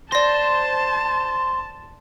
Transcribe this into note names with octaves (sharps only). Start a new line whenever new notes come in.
C5 D5 A5 A#6